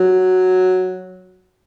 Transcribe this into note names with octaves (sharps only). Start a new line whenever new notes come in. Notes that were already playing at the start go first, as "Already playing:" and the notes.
Already playing: F#3